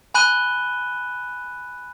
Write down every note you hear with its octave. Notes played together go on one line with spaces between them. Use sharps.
G#5 B5 F#6 D#7 G7